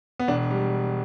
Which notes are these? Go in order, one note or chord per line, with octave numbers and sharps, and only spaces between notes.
B3
E1 D4
G3